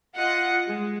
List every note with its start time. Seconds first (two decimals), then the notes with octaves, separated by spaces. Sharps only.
0.16 F4 D#5 F#5
0.67 G#3